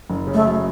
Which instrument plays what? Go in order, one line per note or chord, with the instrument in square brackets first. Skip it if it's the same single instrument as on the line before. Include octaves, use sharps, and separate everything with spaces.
[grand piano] F#1
C#3
[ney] A3
[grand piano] F#3